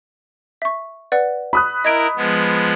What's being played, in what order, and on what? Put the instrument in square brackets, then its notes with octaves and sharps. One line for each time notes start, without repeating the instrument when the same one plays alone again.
[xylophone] E5 C#6
B4 D5 F#5
[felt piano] B5 D#6 F#6
[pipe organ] E4 A#4 [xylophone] D#5 G#6 D7
[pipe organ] F3 G#3 B3